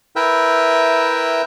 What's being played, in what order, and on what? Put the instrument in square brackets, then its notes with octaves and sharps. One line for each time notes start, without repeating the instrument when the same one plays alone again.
[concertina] E4 A#4 B4 E5 G5